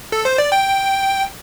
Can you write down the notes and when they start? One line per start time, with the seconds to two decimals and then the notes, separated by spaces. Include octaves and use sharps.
0.12 A4
0.25 C5
0.38 D5
0.52 G5